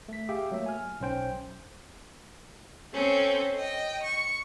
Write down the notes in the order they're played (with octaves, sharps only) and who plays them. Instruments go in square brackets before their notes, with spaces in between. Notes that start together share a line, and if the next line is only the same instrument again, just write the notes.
[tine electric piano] A3 B6
G4 G#4 E5 F5 G5
F#3 A3 A#3 E5
G#5 F6
B1 C#4 C5 G5
[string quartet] C4 C#4 A4
D#5 G5
C#6